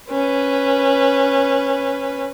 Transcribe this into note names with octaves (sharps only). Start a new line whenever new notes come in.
C#4 B4